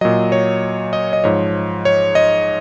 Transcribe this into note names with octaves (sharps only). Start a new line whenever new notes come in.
A#2 F#3 D#5
C#5
D#5
D#5
G#2 F3 C#5
C#5
D#5